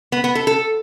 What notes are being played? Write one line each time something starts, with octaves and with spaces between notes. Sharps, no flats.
B3
B3
A4
A4